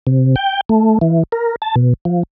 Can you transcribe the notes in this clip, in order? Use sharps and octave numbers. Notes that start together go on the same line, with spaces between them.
C3
G5
A3
E3
A#4
A5
B2
F3